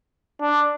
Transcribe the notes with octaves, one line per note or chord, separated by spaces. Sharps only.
D4